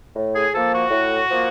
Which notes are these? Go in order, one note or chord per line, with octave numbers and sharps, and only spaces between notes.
A2
G#4
F3 A#3 A4
F#4
A2
F3 A#3